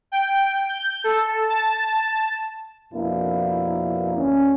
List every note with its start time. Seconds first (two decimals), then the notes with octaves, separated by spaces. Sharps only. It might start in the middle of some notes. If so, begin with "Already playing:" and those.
0.12 G5
0.68 G6
1.04 A4
1.50 A5
2.93 F2 B2 A#3 D4 E4
4.16 D2 C#4